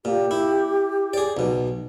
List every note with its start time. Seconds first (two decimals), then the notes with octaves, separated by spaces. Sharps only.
0.05 A#2 G4
0.31 E4
1.13 G#4 D5
1.37 B1 B2